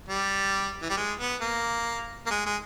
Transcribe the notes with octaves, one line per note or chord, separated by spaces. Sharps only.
G3
E3
G3
G#3
B3
A#3
A#3
G#3
G#3